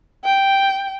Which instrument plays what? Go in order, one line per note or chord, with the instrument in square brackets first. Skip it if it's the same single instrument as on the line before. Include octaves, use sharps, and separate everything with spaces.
[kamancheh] G5